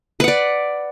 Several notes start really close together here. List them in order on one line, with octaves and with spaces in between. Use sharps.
B4 F#5 D5